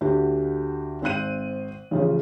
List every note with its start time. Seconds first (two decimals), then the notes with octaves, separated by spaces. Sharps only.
0.01 D2 F#4 G4
1.02 G#1 C4 C5 F#6 D#7
1.91 A1 C#3 F3